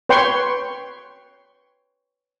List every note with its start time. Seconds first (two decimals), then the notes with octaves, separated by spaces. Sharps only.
0.09 B4 C#5 G5 C6 C#6